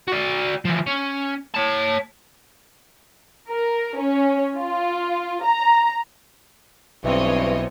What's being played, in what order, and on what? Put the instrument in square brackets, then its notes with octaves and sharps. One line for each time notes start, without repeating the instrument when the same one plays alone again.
[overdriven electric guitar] F#4 D5
E3 F3
C#4
C#5 A5
[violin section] A#4
C#4
F4
A#5
[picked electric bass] B1 [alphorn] G2 [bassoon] E3 [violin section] C4 C#5 D#5